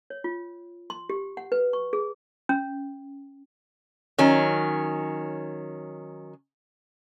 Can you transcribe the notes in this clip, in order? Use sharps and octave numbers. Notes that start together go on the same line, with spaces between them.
C#5
F4
C6
G4
F#5
B4
C#6
G#4
C#4
D#3 F#3 C#4